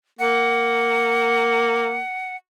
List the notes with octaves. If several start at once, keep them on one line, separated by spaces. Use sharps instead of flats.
A#3 F#5